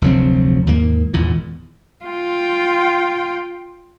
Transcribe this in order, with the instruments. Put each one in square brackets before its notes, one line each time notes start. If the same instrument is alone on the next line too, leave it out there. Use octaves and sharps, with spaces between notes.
[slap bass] F1 D2 F#3 C4
D#2 G#2 D#3 A#3
G#1 E2 A#2
[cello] F4 G5